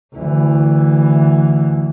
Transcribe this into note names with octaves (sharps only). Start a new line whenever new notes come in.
D2 E3